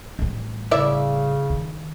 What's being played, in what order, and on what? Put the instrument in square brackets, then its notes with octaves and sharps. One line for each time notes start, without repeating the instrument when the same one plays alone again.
[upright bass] A1 G3
[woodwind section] C#3 [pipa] E4 D5 E5
[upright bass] D#3